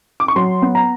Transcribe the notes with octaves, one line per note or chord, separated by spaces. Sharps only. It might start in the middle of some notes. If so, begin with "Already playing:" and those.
D6
C#6
F#3 C6
B3
A#5